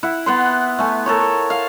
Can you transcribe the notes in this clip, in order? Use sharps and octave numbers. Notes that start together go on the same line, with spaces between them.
E4 F#5
B3 F#5 C6
A3 G#5
A4 A#4 C#5
F5